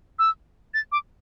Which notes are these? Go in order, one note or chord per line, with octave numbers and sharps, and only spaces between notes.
E6
A6
D6